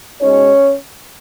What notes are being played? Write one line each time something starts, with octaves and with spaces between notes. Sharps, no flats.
B2 G#3 C#4 D#4 C#5